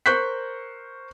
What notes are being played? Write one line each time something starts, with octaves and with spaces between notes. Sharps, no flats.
A#4 C5 C#6 F#6 G6 B6